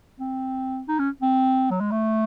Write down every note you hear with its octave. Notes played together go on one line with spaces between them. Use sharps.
C4
D#4
C#4
C4
F#3
G#3
A3